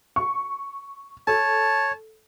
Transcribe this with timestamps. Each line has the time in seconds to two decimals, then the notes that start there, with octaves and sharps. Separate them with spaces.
0.16 C#6
1.27 A4 C#5 A5